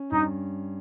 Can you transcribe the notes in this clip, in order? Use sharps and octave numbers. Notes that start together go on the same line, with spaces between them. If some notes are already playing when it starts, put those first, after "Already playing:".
Already playing: C#4
G2 D#4